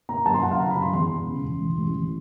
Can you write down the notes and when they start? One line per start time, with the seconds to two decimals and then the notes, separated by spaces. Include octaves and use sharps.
0.09 A#3 A#5
0.26 F#2 A5
0.34 C6
0.43 F#2 F#5
0.51 F5
0.59 C#3 A#5
0.71 B5
0.77 F#2
0.82 C6
0.93 E2 C6
1.10 E1
1.27 C#3
1.44 E1
1.61 A1
1.78 A1
1.95 A1